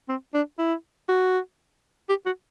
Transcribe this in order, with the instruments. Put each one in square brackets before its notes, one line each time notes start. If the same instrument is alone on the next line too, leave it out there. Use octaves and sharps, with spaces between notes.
[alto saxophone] C4
D4
E4
F#4
G4
F#4